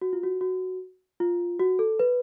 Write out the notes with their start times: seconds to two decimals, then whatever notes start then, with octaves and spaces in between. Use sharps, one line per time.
0.01 F#4
0.13 F4
0.23 F#4
0.41 F#4
1.20 F4
1.60 F#4
1.79 A4
1.99 B4